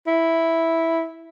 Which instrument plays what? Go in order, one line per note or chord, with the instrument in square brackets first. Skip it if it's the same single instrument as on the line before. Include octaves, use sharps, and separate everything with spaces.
[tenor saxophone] E4